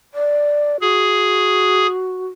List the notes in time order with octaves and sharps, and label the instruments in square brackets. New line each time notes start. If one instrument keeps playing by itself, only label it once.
[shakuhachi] D5
[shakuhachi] F#4 [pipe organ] G#4